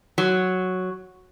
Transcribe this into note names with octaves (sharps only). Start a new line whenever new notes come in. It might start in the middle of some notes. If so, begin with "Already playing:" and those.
F#3